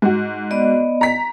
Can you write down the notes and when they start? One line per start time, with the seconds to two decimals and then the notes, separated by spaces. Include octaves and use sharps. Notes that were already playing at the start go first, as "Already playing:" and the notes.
0.02 G#2 F#4
0.51 B3 D5 D#5
1.01 A#5 B6